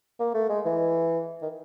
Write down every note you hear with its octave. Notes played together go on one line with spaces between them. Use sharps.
A#3
A3
G#3
E3
D#3